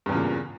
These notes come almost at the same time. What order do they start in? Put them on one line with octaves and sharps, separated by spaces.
G2 E2 C#3 A#2